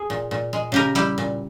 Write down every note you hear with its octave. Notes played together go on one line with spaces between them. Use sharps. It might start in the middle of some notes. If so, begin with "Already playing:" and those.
Already playing: G#4
A#2
A#2
G#3
C#3 G4 A#4
G3 E4 G4
A#2